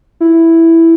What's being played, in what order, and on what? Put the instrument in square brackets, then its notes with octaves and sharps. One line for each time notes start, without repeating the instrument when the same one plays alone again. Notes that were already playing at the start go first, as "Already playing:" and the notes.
[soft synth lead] E4